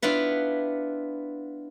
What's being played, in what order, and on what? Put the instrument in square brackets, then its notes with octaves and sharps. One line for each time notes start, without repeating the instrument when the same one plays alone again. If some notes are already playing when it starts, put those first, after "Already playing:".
[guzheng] B3 D4 E4 F4 B4